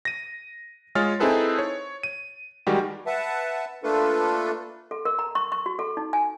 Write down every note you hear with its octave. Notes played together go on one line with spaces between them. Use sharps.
A#6 D#7
G#3 F4 G#4 C#5 F6 A6
C4 D#4 E4 G#4 A4 B4
C#5
D#7
D#3 G3 G#3 F#4 G4
B4 E5 F#5 A5
A3 A#3 D4 F4 A4 B4
A4
A#4
A#5
C#6
C#6
F#4
A4
D#4
G#5